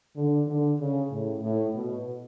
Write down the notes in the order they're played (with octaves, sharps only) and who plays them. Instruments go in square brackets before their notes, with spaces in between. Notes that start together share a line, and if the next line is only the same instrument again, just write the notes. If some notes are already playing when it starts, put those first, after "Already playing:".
[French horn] D3
D3
C#3
A2
A2
B2